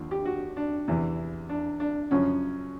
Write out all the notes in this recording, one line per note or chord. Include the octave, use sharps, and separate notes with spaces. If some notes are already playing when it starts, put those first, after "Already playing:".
Already playing: D#2 D3 F3
G4
F#4
D4
E2 C3 E3
D4
D4
F#2 C#3 F3 C#4